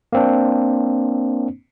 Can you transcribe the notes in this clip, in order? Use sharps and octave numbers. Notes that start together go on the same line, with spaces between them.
A#3 C4 D4